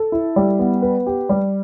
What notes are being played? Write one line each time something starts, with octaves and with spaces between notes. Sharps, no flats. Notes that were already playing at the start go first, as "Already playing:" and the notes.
Already playing: A4
E4
G3
B3
B4
G4
G3